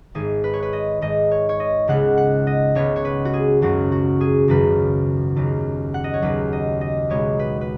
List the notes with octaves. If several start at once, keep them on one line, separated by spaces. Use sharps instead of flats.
G#1 G#2 G#3 G#4
B4
C#5
B4
D#5
G#1 G#2 G#3 D#5
C#5
C#5
D#5
C#2 C#3 G#3 B3 F#5
F#5
D#5
C#2 C#3 G#3 B3 C#5
C#5
B4
F#4
G#4
G#1 F#2 C#3 F#3 F#4
F#4
G#4
G#1 F#2 C#3 F#3 B4
D#2 C#3 F#3 B3
F#5
D#5
C#5
D#2 C#3 F#3 B3 B4
D#5
D#5
B1 B2 G#3 B3 C#5
B4
B4